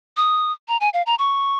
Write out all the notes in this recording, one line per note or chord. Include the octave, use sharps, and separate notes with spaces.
D#6
A#5
G#5
F5
A#5
C#6